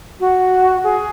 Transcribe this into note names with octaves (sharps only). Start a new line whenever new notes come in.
F#4
G#4